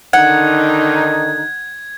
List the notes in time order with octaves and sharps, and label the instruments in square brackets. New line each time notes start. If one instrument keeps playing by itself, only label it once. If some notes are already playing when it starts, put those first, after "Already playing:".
[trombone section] D3 D#3 D#4 [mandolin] F#5 [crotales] G#6